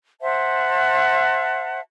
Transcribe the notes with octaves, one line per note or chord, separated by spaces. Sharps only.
C5 E5 F#5 A5